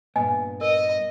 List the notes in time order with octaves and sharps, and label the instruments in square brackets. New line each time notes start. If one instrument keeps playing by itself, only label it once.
[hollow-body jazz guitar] G2 A#2 B3 [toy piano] D#5 G#5
[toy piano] A#4 [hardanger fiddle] D#5